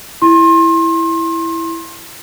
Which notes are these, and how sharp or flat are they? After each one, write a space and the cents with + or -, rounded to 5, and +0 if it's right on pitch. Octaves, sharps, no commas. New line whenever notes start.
E4 +0 C6 +30